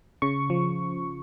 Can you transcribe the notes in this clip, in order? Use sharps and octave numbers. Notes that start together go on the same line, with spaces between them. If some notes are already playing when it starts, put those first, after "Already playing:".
C#3 C#6
F3